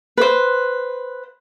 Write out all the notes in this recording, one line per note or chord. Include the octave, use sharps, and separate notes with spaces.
B4 C5